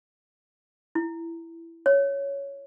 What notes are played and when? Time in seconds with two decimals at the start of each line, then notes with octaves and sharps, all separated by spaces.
0.95 E4
1.86 C#5